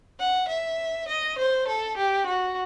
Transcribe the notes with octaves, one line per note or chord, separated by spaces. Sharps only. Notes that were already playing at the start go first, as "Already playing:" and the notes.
F#5
E5
D#5
C5
A4
G4
F#4